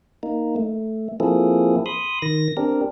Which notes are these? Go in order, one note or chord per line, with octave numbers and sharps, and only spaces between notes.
A#3 D#4
A3
F3 A#3 C4 E4 G#4 A4
B5 C6 D#6
D#3 A#6
C4 D4 G4 A#4